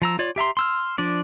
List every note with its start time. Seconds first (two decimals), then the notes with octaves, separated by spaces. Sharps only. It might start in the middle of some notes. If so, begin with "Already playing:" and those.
0.02 F3 A#5 E6
0.19 F4 C#5 D5
0.36 G4 E5 A#5 C6
0.57 C6 E6 F6
0.98 F3 D4 D5